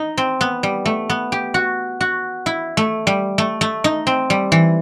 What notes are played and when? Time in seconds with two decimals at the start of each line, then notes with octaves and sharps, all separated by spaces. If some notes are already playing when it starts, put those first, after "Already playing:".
Already playing: D#4
0.18 C4
0.41 B3
0.63 G3
0.86 A3
1.10 B3
1.32 G4
1.54 F#4
2.01 F#4
2.46 E4
2.77 A3
3.07 G3
3.38 A3
3.61 A3
3.84 D#4
4.07 C4
4.30 G3
4.52 E3